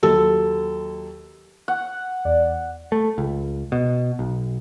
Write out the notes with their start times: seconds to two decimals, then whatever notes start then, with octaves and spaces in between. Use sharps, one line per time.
0.03 D#2 F#3 A4
1.68 F#5
2.25 E2 D5
2.92 A3
3.18 C#2
3.72 B2
4.19 B1